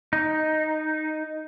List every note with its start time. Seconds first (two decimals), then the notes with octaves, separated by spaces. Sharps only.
0.13 D#4